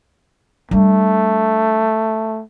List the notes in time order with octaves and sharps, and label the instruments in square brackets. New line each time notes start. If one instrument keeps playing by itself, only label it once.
[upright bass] G3 D4 [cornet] A3